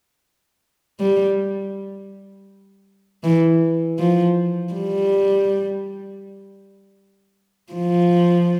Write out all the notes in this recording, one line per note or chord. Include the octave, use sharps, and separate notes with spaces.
G3
E3
F3
G3
F3